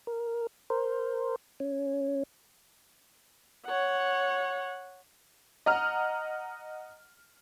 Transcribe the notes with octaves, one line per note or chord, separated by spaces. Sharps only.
A#4
A#4 C5
C#4
C#5 F#5
D#5 F#5 A#5 F6